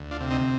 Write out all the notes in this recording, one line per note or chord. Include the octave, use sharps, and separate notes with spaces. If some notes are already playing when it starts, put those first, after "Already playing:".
Already playing: D2
D4 F4
C3
C4 D#4